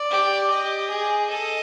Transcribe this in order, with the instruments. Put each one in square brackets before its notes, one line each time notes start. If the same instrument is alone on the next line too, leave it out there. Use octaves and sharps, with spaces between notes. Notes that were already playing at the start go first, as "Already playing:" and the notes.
Already playing: [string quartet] D5
[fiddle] G4
[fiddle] G4 [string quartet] D#5
[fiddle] G#4
[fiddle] A4 [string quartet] D#5